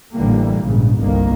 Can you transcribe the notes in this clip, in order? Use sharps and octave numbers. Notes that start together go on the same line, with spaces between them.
A1 D3 E3 G3 A#3
A#1 G#2 C#3
G1 C2 D#3 A#3